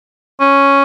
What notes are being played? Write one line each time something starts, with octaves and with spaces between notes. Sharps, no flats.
C#4